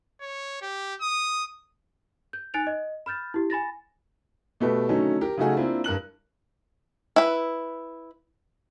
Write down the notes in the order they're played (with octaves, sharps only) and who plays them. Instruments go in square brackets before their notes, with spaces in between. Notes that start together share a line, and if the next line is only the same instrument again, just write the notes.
[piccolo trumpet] C#5
G4
D#6
[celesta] G6
D#4 G#5 F#6 A6 D7 F7
D#5
B5 F6 G6 A6
E4 G4
G#5 B5 A6 A#6
[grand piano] B2 A3 G4 B4
D3 D#3 F#3 A3 C#4 D#4
G4 A#4
C#3 F#3 A3 D#4 F#4 G#4
A#3 C4 D4 E4 F4
G2 A#4 F#6 F#7
[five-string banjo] E4 B4